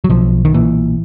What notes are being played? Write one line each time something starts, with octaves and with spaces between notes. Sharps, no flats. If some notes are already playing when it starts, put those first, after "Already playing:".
F#3
B1 F3
D#3
A#2 E3